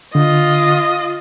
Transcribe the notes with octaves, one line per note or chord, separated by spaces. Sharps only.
D3 F4 D#5